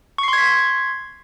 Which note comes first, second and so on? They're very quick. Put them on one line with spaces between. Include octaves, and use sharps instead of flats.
C#6 C7 C6 G#6 B6